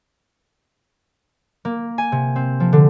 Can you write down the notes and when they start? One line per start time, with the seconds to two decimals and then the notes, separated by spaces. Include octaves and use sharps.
1.65 A#3
1.98 G#5
2.12 C3
2.36 C4
2.60 F3
2.73 D3